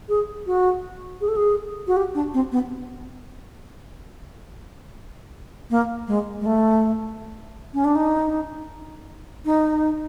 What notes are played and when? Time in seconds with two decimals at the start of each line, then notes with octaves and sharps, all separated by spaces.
0.09 G#4
0.47 F#4
1.21 G#4
1.28 A4
1.36 G#4
1.87 F#4
1.97 G4
2.15 D4
2.34 C4
2.52 B3
5.70 A#3
6.08 G#3
6.40 G#3
6.46 A3
7.74 C#4
7.84 D4
7.95 D#4
9.45 D#4